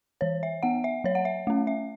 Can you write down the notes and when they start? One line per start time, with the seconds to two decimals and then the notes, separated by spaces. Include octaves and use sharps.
0.21 E3 C#5
0.43 E5
0.63 B3 F#5
0.84 E5
1.04 F#3 C#5
1.15 F#5
1.25 E5
1.47 A3 C#4
1.67 E5